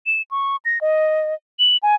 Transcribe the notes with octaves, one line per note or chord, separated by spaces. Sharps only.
E7
C#6
A#6
D#5
F#7
G#5